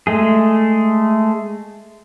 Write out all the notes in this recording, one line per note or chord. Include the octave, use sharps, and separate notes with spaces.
G#3 A3 G#4